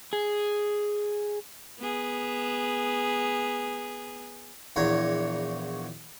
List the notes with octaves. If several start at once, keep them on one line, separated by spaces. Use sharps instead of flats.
G#4
B3 G#4
A#1 E2 C#5 A#5